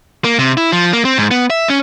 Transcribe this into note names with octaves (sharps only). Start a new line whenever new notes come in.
A#3
C3
E4
F3
A#3
C4
G#2
B3
E5
C#4